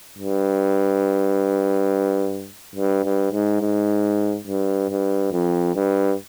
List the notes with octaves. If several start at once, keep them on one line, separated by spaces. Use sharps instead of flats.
G2
G2
G2
G#2
G#2
G2
G2
F2
G2